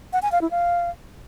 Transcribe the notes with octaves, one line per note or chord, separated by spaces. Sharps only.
F#5
G#5
F5
E4
F5